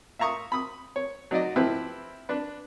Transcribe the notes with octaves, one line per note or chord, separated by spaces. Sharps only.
E5 F5 A#5 C#6 D#6
B5 D#6
C#5
F#3 D#4 D5 D#5
F3 C4 E4 G4 B4
D4 B4